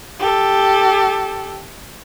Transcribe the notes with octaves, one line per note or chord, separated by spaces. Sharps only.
G4 A4